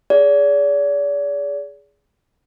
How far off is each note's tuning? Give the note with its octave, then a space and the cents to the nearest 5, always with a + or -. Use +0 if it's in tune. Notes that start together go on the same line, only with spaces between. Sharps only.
G#4 +0 D5 -40